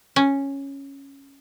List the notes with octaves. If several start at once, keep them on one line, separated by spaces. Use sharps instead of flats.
C#4